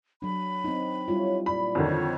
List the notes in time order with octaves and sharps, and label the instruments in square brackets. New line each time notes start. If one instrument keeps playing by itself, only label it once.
[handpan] F#3 D4 [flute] B5
[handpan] C4 D#4
[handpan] G3 E4 F4 [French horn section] C#5
[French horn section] A#2 D5 [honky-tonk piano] B5
[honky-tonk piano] F2 D3 D#3 [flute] C#5